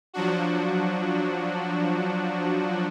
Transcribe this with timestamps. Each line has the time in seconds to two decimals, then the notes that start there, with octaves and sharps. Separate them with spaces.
0.14 F3 F#3 D4 F#4